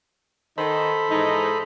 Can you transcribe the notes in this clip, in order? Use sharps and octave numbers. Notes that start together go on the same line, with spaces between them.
D#3 D#4 A4 C5 B5
G#2 E3 D#4